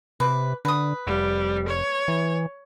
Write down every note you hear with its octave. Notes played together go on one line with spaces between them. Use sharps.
C3 B4 D6
D3 B4 D#6
F1 G3
C#5
E3